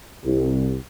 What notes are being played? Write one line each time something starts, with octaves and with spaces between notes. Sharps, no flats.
C2